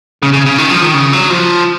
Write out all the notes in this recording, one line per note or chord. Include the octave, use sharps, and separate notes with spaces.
C#3
C#3
C#3
D#3
F3
D#3
C#3
F#3
F3